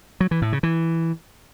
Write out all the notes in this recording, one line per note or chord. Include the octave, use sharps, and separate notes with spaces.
F#3
E3
A2
C#3
E3